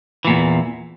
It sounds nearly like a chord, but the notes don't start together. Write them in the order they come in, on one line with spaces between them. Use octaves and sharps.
E3 A#2 E2